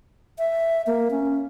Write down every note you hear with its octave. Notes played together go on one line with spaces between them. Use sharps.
E5
A#3
C#4